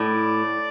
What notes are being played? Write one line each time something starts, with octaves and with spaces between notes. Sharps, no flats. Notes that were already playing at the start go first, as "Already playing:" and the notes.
Already playing: A2 D5